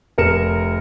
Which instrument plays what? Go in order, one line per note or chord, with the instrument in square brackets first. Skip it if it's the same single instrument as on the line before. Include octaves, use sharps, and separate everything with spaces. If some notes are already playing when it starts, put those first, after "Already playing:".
[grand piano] F1 A#4 C#7 E7